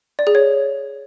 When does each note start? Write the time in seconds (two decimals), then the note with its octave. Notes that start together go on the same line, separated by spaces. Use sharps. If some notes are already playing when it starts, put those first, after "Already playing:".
0.19 D5
0.27 G#4
0.35 C#5